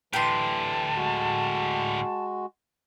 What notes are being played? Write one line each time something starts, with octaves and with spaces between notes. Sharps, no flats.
A2 D3 E3 G4 G5 A5 C6
G#3 F#4